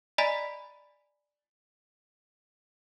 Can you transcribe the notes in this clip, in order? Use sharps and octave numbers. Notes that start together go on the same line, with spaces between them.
D5 D#5 G#5 A#5 B5 B6